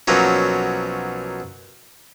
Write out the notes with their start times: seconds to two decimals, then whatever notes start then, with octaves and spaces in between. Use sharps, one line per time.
0.08 B1 F3 F#3 A#3 C#4